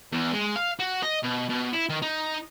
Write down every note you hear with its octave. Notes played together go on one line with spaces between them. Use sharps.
E2
G#3
F5
F#4
D#5
B2
B2
E4
D#3
D#4